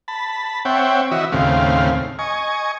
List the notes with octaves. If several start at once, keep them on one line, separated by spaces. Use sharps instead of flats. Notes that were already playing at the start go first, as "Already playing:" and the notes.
A5 B5
C4 C#5 E5 F#5 G5
E3 F#4 D#5 E5
D#2 A2 C#3 C4 F5
D#5 G#5 C#6